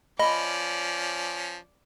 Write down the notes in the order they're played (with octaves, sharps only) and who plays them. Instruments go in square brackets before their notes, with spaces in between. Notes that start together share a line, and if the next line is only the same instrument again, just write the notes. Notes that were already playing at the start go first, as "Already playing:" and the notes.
[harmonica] F3 C#4 [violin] D5 [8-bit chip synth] D#5 [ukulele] B5